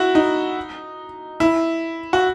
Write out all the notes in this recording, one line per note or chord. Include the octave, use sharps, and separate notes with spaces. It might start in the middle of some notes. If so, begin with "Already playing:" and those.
Already playing: E4 F#4
D#4
E4
F#4